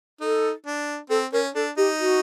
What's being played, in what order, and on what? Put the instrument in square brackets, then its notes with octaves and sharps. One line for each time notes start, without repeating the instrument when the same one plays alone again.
[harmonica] D#4 [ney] A4
[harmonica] D4
[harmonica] C4 [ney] A4
[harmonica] C#4 [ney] A#4
[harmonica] D4 [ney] A4
[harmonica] D#4 [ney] G4
[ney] F#4